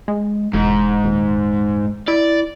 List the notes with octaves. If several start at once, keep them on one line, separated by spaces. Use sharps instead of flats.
G#3
E1 G#2
D#1
E4 D5